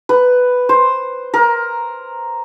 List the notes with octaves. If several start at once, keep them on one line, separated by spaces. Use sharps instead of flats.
B4
C5
A#4